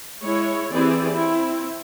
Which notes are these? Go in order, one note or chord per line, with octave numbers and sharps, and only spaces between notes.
G#3 E4 C#5
E3 C4 E4 G4 G#4 D5
C4 E4